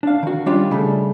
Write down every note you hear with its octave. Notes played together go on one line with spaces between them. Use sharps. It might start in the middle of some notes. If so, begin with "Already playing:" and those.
D4 F5
D#3 F#4
G3 C#4 D4 F4 G4
C#3 G3 A3